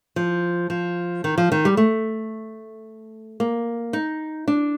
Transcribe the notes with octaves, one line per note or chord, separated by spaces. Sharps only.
F3
F3
D#3
F3
D#3
G3
A3
A#3
D#4
D4